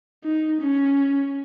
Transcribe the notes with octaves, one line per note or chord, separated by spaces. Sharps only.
D#4
C#4